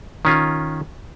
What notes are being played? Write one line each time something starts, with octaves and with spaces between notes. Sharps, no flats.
D#3 C#4 F4